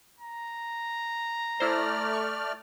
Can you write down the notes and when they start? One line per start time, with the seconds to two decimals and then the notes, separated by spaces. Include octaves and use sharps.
0.20 A#5
1.60 A3 E4 C5 D5 F6
2.13 C#6